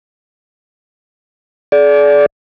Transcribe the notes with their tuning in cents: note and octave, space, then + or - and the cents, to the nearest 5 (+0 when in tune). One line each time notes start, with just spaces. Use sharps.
G#4 +45 D5 -15